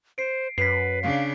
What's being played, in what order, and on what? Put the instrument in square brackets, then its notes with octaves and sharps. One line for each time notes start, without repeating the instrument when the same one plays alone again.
[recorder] C5 [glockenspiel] C7 D7
[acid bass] F#2 [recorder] B4 [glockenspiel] B6 C7
[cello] C#3 D4 [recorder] F5